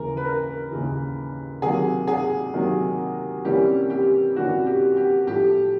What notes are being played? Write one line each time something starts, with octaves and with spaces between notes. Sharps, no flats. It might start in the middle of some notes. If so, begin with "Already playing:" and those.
Already playing: D#2 C#3 E3 A#4
B4
A#4
D#2 C#3 E3
C3 D#3 F#3 A#3 G#4
G#4
C3 D#3 F#3 A#3
C3 E3 G3 A#3 C#4 G4
G4
C3 E3 G3 A#3 C#4 F#4
G4
G4
A2 F3 A3 G4